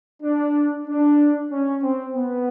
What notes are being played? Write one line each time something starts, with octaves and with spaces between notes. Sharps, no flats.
D4
D4
C#4
C4
B3